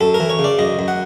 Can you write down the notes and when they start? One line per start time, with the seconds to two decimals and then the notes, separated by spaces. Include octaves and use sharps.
0.01 F#2 A4
0.14 A#4
0.20 E3
0.30 C#5
0.39 C#3
0.44 D5
0.59 F#2 D#5
0.79 F#2
0.88 F#5